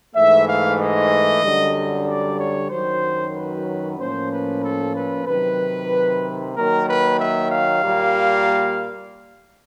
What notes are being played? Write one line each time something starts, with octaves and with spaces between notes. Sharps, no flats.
G#2 E3 A3 E5
F5
D#5
F#2 D3 G3
D5
C#5
F#2 D#3 F#3 C5
B4
A2 F3 A#3 C#4 C5
B4
A4
B4
C3 D#3 F#3 B4
D#3 F#3 A#3 A#4
B4
E5
F5
A#2 G3 A#3